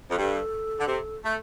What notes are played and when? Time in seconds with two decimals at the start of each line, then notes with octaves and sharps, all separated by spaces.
0.10 F2
0.18 G2 A4
0.78 D3
0.88 C3
1.24 A3